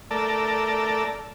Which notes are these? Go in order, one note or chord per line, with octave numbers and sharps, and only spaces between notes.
A3 A4 A#4 D5